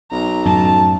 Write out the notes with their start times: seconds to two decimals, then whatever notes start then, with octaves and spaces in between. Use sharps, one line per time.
0.12 B1 A#5
0.45 F#2 A2 F#3 A5